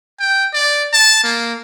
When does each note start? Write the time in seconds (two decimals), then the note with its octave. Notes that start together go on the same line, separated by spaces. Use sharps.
0.20 G5
0.53 D5
0.93 A5
1.24 A#3